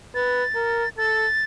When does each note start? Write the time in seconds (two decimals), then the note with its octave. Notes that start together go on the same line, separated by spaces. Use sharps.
0.15 B4 A6
0.55 A#4
0.97 A4 A6